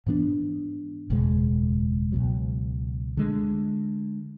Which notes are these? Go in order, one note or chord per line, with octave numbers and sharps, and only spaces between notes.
G#2 E3 B3 D4
F#1 E2 B2 G#3
C#2 B2 F#3
D3 G#3